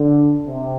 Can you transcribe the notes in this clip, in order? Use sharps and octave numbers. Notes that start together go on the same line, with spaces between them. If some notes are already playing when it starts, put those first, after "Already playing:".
Already playing: D3
C3